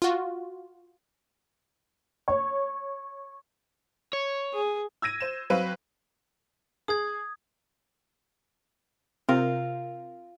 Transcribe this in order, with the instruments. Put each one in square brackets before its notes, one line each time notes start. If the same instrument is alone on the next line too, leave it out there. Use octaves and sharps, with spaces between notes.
[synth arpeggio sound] F4 F#4
[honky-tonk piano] C#5
[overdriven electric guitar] C#5
[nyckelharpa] G#4
[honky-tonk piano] E6 G#6 A#6 D#7
C5 E7
F#3 C4 B4 F5 D#7
[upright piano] G#4 [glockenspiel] D#6 G#6
[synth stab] C3 C4 A#4 [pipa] F4